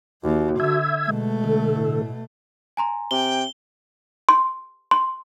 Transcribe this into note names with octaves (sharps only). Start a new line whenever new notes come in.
D#2 F#4
D3 E5 E6 G#6
B2 G#3 A3
D3 A4
A2
G#5 A#5 C6
C3 G5 G7
C6
C6